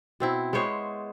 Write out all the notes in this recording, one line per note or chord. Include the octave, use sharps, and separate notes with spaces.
B2 C4 E4
G#3 B3 C5 C#5